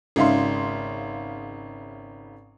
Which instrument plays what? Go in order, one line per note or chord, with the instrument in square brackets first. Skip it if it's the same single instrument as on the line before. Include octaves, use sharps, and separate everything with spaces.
[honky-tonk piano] G#1 C#3 D#4 E5 F5 C6